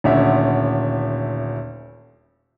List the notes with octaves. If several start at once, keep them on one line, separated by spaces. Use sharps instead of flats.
D#1 D2 C#4 E5